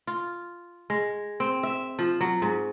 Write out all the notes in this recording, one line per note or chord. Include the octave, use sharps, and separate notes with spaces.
F4
G#3
C4
E5
F3
F#3
G#2